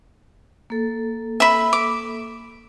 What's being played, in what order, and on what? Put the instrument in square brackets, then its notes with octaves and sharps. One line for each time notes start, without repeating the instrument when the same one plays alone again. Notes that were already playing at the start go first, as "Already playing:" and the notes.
[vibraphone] A#3 A4
[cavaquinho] E5 B5
D6